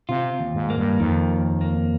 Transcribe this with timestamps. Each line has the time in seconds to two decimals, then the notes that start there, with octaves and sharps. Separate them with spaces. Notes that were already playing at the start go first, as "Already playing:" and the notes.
0.09 C3 F4
0.39 D#2
0.54 G#2
0.70 A#3
0.77 G2
1.00 F2 D#3
1.30 D#2
1.61 A#3